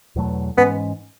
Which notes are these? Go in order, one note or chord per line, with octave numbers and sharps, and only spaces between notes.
E2 B2 F#3 A3
G#2 E3 G#3 B3 C#4